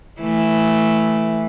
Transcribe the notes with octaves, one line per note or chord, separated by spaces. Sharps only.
E3 A3